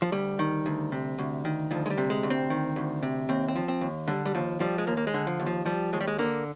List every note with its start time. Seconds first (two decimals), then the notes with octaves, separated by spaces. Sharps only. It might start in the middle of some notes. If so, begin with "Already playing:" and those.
0.02 F3
0.12 D2 G3
0.39 D#3
0.66 D2
0.92 C3
1.19 D2
1.45 D#3
1.71 D2 F3
1.86 G#3
1.90 G3
1.97 C3
2.10 G#3
2.23 D2
2.30 C4
2.50 D#3
2.76 D2
3.02 C3
3.29 D#2 C4
3.48 C4
3.56 F3
3.68 C4
3.81 D#2
4.08 D3 G3
4.25 G3
4.34 D#2 F3
4.60 F3 G3
4.78 G#3
4.87 D#2 A#3
4.97 A#3
5.07 G#3
5.14 D3
5.27 F3
5.40 D#2
5.46 F3
5.65 F3 G3
5.93 D#2 G#3
6.01 G3
6.07 G#3
6.18 D3 A#3